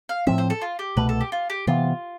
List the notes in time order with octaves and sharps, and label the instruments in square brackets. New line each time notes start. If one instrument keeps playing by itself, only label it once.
[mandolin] F5
[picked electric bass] A2 F3 C4 [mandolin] E5
[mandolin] C5
A4
F4
G4
[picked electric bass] C2 B2 A3 [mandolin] B4
[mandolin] A4
G4
F4
G4
[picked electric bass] C3 E3 B3 [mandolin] F4